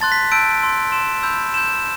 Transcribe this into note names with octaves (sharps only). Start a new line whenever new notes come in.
A5 C6 F#6 A6
B6
A5 E6 G6 D7
A5 C6 E6
C6 G6 E7
B5 E6 G6
C6 G6 E7